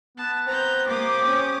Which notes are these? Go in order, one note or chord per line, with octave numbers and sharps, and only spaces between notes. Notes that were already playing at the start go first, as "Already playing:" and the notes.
B3 A5
C4 A#5 G6
A#3 G4 D6 D#6
C#4